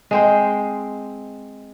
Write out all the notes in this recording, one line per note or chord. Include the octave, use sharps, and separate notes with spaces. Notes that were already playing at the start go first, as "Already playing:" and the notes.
G#3 C4 C5